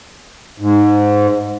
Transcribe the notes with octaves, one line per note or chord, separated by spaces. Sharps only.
G#2